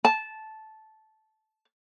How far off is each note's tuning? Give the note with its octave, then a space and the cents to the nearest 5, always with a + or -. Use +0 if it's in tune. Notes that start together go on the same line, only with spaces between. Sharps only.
A5 -10